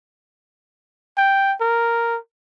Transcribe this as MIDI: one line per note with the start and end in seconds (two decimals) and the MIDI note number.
1.17 1.54 79
1.61 2.17 70